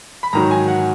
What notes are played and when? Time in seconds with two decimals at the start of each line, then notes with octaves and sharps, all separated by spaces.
0.23 B5
0.33 G#2 D#3 F#3 A#5
0.51 G#5
0.68 F#5